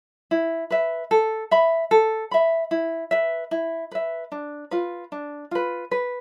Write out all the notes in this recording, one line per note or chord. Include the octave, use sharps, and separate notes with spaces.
E4
B4 E5
A4
E5 B5
A4
E5 B5
E4
B4 E5
E4
B4 E5
D4
F4 B4
D4
F4 B4
B4